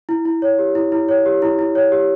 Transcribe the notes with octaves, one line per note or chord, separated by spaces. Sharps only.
E4
E4
C#5
G4
E4
E4
C#5
G4
E4
E4
C#5
G4